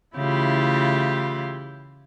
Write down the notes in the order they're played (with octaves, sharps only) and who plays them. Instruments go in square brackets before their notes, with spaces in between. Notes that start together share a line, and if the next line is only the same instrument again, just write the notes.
[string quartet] C#3 E3 A3 E4 F4 G4